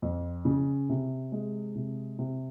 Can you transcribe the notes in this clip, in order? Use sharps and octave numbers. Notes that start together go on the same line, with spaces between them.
F2
C#3
C3
G#3
C3
C3